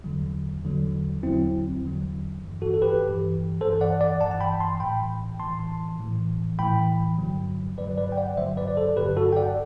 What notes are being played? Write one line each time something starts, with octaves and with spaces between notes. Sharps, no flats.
E2 D3 F#3
E2 D3 F#3
E2 D3 F#3 C4 E4
E2 D3 F#3
G2 E3
F#4 A4
A4
G4 B4
G2 E3
G2 E3 A4 C5
D5 F#5
D5 F#5
G2 E3 F#5 A5
A5
G5 B5
A5 C6
A2 E3 G5 B5
A2 E3 A5 C6
A2 E3
A2 E3 G5 B5
G2 D3 F#3
G2 D3 F#3 B4 D5
B4 D5
G5
D5 F#5
G2 D3 F#3 C5 E5
B4 D5
D5
A4 C5
G2 D3 F#3 G4 B4
F#4 A4
G5
D5 F#5